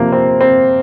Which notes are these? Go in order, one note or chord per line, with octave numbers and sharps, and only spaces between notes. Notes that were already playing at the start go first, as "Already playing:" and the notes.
Already playing: C3 F3 A#3
C4
C4